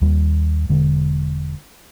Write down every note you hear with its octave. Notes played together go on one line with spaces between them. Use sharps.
D#2 G3
E1 D3 G#3